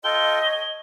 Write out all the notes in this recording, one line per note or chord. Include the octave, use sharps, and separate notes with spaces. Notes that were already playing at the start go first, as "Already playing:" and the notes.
F4 A4 D#5 G5 G7
C#5